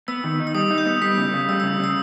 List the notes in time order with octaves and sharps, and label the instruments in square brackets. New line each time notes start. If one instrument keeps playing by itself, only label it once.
[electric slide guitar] B3 [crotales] E6
[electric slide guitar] D#3
D#4
[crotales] E6
[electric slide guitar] G3 [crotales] D#6
[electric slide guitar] D#4
[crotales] G6
[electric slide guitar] B3
[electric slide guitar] G3 [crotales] B6
[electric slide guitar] C#3
C#3
[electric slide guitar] G3 [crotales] E6
[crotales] E6
[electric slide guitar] C#3
[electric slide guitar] C#3 [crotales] E6